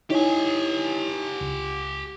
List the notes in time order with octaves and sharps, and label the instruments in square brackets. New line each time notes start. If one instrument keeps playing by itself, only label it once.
[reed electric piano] D#4 E4 C#5 [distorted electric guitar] G4 G#5
[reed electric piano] C#2